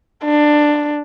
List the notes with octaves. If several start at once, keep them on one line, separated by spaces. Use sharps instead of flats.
D4